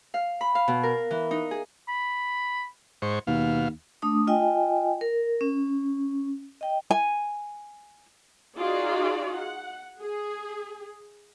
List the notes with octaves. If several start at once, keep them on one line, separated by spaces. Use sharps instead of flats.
F5
B5
F5
B2
A#4
E3
D#4
G#4
B5
G#2 C5 C#6
D#2 B2 F5
A3 D4 D#6
F4 D#5 G5 G#5
A#4
C#4
D#5 G5
G#5
D#4 F4 F#4 G#4 D5
F#5
G#4